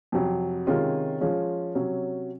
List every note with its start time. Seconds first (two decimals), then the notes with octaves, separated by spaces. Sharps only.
0.12 F2 C3 F#3
0.67 C3 D#3 G#3 C#4 F4
1.21 F3 G#3 C#4 F4
1.75 C3 F#3 C#4